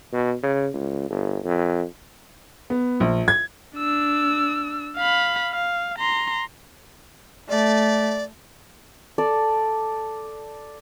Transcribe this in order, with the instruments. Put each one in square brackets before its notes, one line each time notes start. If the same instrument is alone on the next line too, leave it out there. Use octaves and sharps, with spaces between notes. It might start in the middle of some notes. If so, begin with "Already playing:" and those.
[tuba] B2
C#3
C#2
G1
F2
[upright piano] B3
A#1
G#6
[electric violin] D4 E6
F5 B5
F5
A#5 C6
[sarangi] A3 [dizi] D5
[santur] A4 D5